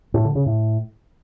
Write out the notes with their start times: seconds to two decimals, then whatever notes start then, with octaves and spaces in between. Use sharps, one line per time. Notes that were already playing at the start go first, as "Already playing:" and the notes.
0.14 A2
0.25 D3
0.35 C#3
0.46 A2